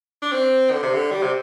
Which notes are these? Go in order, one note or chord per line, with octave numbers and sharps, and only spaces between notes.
D4
C4
D3
C3
D3
G3
C3